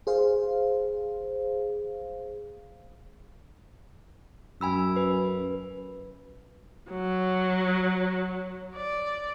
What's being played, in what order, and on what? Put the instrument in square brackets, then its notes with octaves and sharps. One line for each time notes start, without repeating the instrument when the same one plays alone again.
[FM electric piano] G#4 C5 F5
[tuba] F#2 [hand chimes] G#5 B5 E6
[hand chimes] B4
[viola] F#3
D5